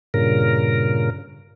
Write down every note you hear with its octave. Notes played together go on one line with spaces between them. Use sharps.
G2 A#2 C#3 A#4